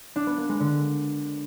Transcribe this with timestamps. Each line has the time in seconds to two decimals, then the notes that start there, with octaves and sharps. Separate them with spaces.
0.16 D4
0.27 B3
0.38 A#3
0.49 G#3
0.60 D3